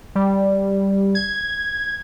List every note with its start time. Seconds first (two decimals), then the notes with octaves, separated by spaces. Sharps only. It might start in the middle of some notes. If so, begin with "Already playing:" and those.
0.15 G3
1.15 G#6